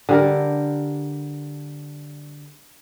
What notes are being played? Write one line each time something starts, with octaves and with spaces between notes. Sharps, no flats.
D3 G3 A#4